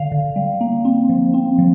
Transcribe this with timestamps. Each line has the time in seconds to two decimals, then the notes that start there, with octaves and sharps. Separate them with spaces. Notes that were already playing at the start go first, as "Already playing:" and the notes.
Already playing: D3 F5
0.12 D3
0.36 G3
0.61 A#3
0.85 C4
1.09 F3
1.34 C4
1.58 F3